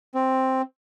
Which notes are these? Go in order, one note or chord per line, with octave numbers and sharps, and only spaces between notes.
C4